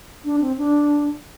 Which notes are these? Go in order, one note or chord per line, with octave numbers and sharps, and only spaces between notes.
D4
C4
D4